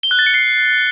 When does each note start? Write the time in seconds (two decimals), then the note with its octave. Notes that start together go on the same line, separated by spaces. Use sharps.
0.03 G7
0.11 F#6
0.19 A6
0.26 C#7
0.34 C7